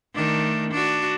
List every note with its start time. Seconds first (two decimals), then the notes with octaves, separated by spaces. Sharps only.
0.15 D#3 A3 D4
0.71 D4 F#4